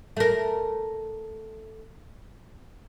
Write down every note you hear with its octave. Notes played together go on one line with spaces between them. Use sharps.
A3 A#4